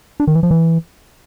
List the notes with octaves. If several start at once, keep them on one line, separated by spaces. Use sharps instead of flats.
D4
D#3
E3
F3
E3